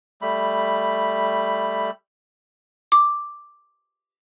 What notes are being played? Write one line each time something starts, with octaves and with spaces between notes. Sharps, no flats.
G3 A3 B5
D6